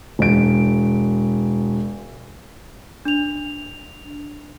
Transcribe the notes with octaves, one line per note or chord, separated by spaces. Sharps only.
E1 D7
D4 F7